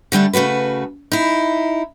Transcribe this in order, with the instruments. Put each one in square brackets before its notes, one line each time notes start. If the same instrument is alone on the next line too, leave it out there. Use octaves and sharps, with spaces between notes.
[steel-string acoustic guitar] D3 G3 A3 D4
C#3 A3 F#4 B4
D#4 E4